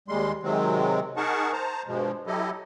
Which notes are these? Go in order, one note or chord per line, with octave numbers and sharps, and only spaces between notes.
D#2 G3 G#3 C6
C3 D#3 F#3 G#3 C4
D#4 G#4 A#4 F#5 A5 C#6
C5 A5 A#5
G2 B2 F3 G#3
F#3 E4 G4 A4 D#5